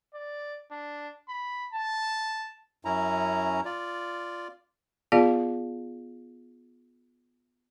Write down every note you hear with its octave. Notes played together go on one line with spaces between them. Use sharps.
D5
D4
B5
A5
F#2 C#4 E4 A#5
F4 D5
B3 F4 G#4 D5 F5